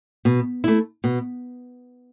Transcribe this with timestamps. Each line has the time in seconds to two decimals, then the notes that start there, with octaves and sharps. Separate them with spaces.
0.25 B2
0.64 A3 E4
1.04 B2